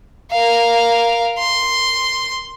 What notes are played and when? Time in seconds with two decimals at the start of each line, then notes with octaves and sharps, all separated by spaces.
0.32 A#4 F5
1.39 C6